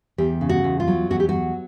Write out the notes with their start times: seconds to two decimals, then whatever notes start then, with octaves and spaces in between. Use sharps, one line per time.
0.18 E2 G4
0.41 C#3
0.49 F#4
0.64 E2
0.80 F4
0.87 F#3
1.10 E2 F#4
1.20 G4
1.29 F#3 F#4